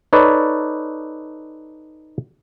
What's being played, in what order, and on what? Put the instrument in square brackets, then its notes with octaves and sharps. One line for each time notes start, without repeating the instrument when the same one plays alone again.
[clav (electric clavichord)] D#4 A4 B4 C#5 D5